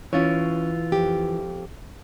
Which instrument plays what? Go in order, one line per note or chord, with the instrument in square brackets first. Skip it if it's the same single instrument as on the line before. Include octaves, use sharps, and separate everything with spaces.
[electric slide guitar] E3 F4 [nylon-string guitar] C#4 C#5
[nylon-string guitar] F2 G#2 G4